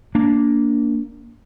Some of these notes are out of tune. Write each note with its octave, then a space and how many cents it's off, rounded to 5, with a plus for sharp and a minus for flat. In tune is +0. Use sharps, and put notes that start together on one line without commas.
A#3 +0 D4 -20